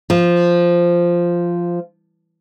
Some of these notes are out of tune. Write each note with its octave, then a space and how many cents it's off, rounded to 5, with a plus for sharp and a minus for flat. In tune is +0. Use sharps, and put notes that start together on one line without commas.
F3 -5